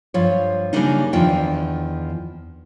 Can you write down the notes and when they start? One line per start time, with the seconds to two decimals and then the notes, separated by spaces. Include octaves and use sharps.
0.14 G2 F3 C#5
0.73 C#3 G3 A3 A#3 D4 D#4
1.13 E2 D#3 F3 D4 G5